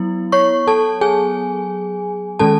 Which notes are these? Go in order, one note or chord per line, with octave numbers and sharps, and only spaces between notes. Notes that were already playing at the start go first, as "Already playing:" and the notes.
Already playing: F#3 B3 E4
C#5 C#6
A4 A5
G#4 G#5
D#3 G#3 C#4 A4 A5